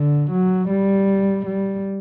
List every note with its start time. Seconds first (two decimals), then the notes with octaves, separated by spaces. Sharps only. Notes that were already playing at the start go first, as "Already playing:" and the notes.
Already playing: D3
0.31 F#3
0.70 G3
1.46 G3